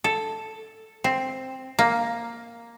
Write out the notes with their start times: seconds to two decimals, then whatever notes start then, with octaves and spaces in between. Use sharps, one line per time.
0.04 A4
1.04 C4
1.79 A#3